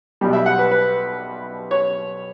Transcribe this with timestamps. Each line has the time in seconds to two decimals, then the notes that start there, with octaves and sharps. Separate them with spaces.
0.21 B1 B2 G3
0.33 E5
0.46 F#5
0.59 B4
0.71 B4
1.71 C#5